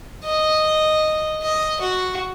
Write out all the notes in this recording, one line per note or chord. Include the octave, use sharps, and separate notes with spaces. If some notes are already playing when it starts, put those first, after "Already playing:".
D#5
D#5
F#4